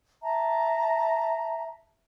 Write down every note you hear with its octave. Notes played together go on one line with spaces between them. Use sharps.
E5 A5 A#5